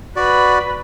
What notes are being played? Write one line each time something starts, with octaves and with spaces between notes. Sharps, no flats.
F#4 B4 D5 B5